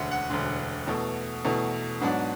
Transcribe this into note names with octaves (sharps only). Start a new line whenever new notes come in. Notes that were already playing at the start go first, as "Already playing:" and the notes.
Already playing: E1 D2 D3 E5 F#5
F#5
E1 D2 D3
E2 B2 A3
E2 B2 A3
G#2 F#3 B3 D4